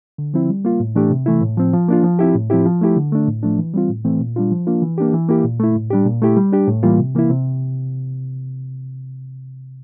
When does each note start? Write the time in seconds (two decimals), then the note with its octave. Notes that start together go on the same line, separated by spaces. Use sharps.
0.18 D3
0.34 F3 C4 E4
0.49 G3
0.65 A#3 F4
0.80 A2
0.95 E3 A3 D4 G4
1.11 C3
1.26 E3 A3 E4
1.42 A2
1.58 F3 C4
1.73 F3
1.89 A#3 D4 F4
2.04 F3
2.19 C4 E4 G4
2.35 A2
2.50 F3 C4 E4 G4
2.65 F3
2.81 A3 E4 G4
2.96 D3
3.12 A3 D4
3.28 A2
3.43 F3 A3 D4
3.58 E3
3.74 G3 C4 F4
3.89 A2
4.05 E3 A3 C4
4.20 A#2
4.36 G3 D4 F4
4.51 F3
4.67 A#3 D4 F4
4.82 E3
4.98 A#3 D4 G4
5.14 E3
5.29 A#3 E4 G4
5.44 A#2
5.60 A3 E4
5.76 A2
5.90 G3 D4 G4
6.06 A#2
6.22 A3 E4 G4
6.37 G3
6.52 D4 G4
6.67 A2
6.83 E3 G3 A#3 F4
6.99 C3
7.15 E3 A#3 E4
7.30 C3